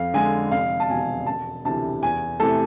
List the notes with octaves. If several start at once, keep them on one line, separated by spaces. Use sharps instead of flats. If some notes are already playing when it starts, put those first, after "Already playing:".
Already playing: F2 F5
D3 G#3 G#5
F1 F5
A5
E2 B2 G#5
E1 A5
D2 C3 E3 A5
E2 G#5
C3 E3 A3 A4